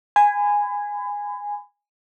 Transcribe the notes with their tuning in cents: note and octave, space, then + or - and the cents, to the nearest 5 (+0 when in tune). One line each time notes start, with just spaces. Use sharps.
G#5 -10 B5 +30